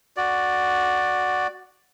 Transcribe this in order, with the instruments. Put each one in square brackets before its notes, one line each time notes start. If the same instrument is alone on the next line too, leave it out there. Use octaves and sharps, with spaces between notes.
[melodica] F#4 D5